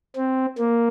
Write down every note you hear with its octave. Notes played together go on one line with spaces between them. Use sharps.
C4
A#3